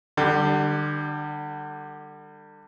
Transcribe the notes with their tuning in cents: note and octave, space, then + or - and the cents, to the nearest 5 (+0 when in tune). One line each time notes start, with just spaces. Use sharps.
D3 +30 G3 +0